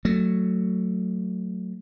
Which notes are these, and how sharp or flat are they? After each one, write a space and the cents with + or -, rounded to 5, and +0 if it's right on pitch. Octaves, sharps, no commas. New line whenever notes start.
F#3 +0 A3 +10